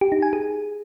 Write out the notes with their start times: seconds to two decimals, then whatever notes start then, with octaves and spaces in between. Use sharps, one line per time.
0.01 G4
0.12 D#4
0.22 G#5
0.33 G#4